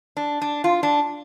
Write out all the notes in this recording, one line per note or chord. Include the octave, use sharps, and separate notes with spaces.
D4
D4
F4
D4